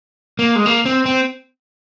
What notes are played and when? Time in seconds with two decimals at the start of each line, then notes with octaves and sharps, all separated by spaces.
0.39 A#3
0.56 G#3
0.66 A#3
0.86 C4
1.06 C4